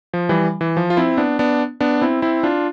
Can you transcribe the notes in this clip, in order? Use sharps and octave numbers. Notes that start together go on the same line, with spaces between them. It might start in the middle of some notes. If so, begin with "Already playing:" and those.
F3
E3 G3
E3
F3
F4
C4 E4
B3 D4
B3 D4
B3 D4
C4 E4
C4 E4
D4 F4